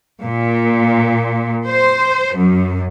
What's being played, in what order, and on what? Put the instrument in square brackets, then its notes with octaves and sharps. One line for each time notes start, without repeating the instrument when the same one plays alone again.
[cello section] A#2
C5
F#2